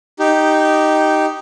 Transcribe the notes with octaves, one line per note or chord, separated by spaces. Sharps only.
D#4 G4